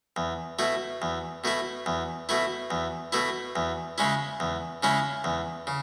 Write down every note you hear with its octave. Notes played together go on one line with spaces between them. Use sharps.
E2
B2 A3 E4
E2
B2 A3 E4
E2
B2 A3 E4
E2
B2 A3 E4
E2
C#3 G#3 C#4 E4
E2
C#3 G#3 C#4 E4
E2
C#3